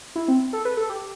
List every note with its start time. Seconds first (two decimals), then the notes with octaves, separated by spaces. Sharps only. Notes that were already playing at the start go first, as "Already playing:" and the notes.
0.16 E4
0.28 C4
0.53 A4
0.65 B4
0.77 A4
0.89 G4